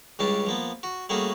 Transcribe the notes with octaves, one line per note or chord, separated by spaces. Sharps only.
C#2 G2 C#3 C#4 D4 A5
F3 A#3 B3
F#4
G3 A3 A#3 C#4 F#4 G#4